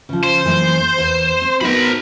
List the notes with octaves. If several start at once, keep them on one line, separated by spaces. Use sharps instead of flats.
C#3 F3
C5
F#2 E3 A#3
E2
C4
B3 D#4 F#4 A#4 B5